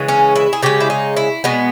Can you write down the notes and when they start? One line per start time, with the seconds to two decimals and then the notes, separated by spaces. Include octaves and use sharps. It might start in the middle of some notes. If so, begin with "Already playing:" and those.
Already playing: C#3 E3 G#3
0.08 C#4
0.35 E4
0.53 G#4
0.62 C#3 G#3 G4
0.80 E4
0.90 D#4
1.17 E4
1.44 B2 G#3 B3